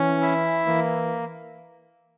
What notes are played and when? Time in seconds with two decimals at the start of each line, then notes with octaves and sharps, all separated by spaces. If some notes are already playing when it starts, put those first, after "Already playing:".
Already playing: E3 C#4
0.21 E4
0.66 E3 A#3